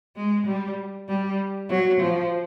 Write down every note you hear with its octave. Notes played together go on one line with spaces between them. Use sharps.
G#3
G3
G3
F#3
F3